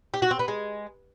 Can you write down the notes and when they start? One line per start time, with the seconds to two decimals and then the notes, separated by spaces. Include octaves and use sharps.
0.14 G4
0.22 F#4
0.31 C4
0.39 B3
0.48 G#3